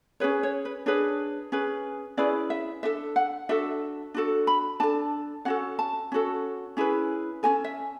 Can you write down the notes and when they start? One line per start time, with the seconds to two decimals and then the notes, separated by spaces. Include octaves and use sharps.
0.20 C#4 G#4 B4 C#5
0.43 C#5
0.65 B4
0.86 D4 G#4 B4 C#5
1.52 C#4 G#4 B4
2.17 C#4 E4 G#4 B4 D5
2.50 E5
2.83 D4 A4 E5
3.16 F#5
3.49 D4 F#4 A4 E5
4.14 D4 F#4 A4
4.47 B5
4.80 D4 A4 A5
5.45 C#4 F#4 A4 F#5
5.79 A5
6.12 C#4 F#4 A4
6.77 C#4 E4 G#4 B4
7.43 C#4 F#4 A4 G#5
7.64 E5